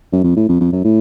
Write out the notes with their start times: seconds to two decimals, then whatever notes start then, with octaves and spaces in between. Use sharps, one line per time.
0.13 F#2
0.24 F2
0.36 A2
0.49 F2
0.61 F2
0.72 F#2
0.84 A2